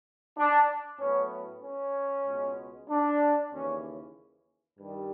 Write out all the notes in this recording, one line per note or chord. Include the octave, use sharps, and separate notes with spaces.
D4
A2 F#3 B3 C#4
C#4
C#2 B2 G#3 B3
D4
D#2 C#3 E3 C#4
G2 D#3 G3